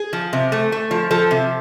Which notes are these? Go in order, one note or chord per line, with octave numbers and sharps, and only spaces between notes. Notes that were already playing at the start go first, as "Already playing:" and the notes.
Already playing: G#4
F3
C3
A3
A3
F3
F3 A4
C3